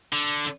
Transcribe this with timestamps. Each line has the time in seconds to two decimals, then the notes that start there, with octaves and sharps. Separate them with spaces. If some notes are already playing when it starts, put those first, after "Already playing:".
0.12 D3